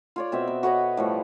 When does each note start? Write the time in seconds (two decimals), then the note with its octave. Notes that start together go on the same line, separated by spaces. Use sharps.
0.16 F4 C#5 D5
0.32 B2 C4 E5
0.47 B3
0.63 F#4 B4 C#5 D#5
0.97 A2 F3 G3